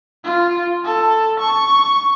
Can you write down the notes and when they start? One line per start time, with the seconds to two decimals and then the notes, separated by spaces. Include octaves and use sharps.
0.24 F4
0.85 A4
1.40 C#6